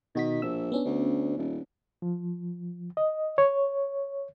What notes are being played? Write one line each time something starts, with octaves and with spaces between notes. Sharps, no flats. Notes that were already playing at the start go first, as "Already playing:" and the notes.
B2 D#3 F#4 B6
A#1 E6
B3 C#4 D4
D2
D#1
F3
D#5
C#5